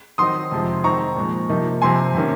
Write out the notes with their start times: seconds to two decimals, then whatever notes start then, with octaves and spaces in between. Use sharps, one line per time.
0.18 D#3 F#3 C4 D#4 C6 D#6
0.51 F2 C3 F3 G#3 C4
0.83 D#3 G#3 C4 D#4 A#5 C#6
1.16 A#2 F3 G#3
1.49 C3 F3 A#3 D#4
1.82 C3 F3 C4 G#5 C6
2.14 C3 D#3 A#3 C#4